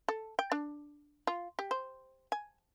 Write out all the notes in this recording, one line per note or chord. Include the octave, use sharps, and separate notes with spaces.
A4
G5
D4
F4
G4
C5
G#5